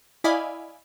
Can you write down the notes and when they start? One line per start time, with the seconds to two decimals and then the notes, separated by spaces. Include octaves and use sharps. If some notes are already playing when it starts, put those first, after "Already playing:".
0.24 E4 D5 D#5 F5 G#5 B5